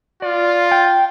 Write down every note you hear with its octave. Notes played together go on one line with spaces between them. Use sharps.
F4 D5
G5